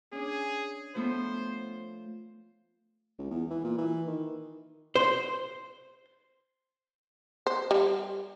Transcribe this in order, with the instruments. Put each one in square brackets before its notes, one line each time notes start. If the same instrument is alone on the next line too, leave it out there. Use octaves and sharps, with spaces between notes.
[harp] C#4 D4 [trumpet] G#4
[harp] F3 A3 B3 [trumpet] C5
[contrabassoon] C#2
E2
E3
A#2
E3
D#3
[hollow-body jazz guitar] C5
[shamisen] C5
G3